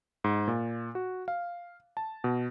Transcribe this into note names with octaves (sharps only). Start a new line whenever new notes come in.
G#2
A#2
F#4
F5
A5
B2